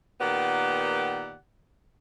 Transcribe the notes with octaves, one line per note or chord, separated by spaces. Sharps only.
A#2 D#3 B3 G4 D5 F#5